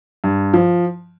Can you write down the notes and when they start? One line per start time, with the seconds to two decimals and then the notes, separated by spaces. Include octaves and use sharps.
0.24 G2
0.53 F3